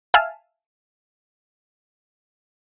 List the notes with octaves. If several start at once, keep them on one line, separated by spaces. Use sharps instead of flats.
E5 F5 G#5 A5 F6